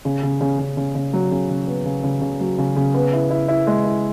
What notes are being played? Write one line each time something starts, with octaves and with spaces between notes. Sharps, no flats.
C#3
C#3
C#3
C#3
C#3
C#3
F#3
C#3
C#3
B3
C#3
C#3
C#3
F#3
C#3
C#3
B3
E4
E4
E4
G#3
E4